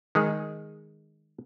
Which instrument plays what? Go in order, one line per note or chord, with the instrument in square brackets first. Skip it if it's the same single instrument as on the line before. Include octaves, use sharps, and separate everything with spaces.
[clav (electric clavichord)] D#3 G#3 G#4